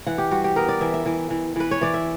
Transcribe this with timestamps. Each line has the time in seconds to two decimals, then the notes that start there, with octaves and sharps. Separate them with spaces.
0.07 E3 F#5
0.18 G4
0.31 G3 F#4
0.44 G4
0.56 B3 A#4
0.69 D5
0.81 E3 E5
0.94 E5
1.06 E3
1.30 E3
1.56 E3 B4
1.71 C#5
1.81 E3 D5
1.94 E5